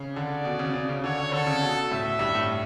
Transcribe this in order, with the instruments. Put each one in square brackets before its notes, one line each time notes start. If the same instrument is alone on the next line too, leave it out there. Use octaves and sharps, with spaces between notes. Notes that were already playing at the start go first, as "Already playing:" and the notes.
Already playing: [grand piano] C#3
[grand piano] D3 [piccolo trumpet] D5
[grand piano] B2
C#3
C#3
C#3
[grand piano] D3 [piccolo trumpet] C#5
[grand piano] D3
[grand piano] D3 [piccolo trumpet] A4
[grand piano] C#3
B2
[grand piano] A2 [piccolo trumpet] E5
[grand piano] G2
A2